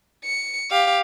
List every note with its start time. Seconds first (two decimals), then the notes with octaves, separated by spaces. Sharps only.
0.25 C#7
0.71 G4 F5